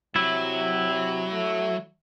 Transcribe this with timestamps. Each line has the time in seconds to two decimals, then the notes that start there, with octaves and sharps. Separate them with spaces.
0.16 C3 F#3 E4
1.32 A3